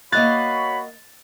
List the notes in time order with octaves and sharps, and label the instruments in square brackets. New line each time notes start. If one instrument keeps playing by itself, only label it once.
[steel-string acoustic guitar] A#3 D#5 F5 [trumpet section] F#4 C#5 B5 [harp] F#6 A6